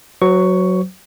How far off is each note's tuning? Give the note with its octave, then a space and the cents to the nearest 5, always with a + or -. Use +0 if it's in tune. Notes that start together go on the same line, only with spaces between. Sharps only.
F#3 +0 C5 -40 C#6 +10